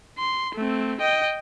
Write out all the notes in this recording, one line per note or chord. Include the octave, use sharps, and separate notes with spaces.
C6
A3 C4
D#5 G5